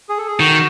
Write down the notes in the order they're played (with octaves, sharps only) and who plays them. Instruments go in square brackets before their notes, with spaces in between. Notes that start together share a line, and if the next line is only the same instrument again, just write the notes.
[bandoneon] G#4
A4
G#4
[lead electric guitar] D#3 [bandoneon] F#4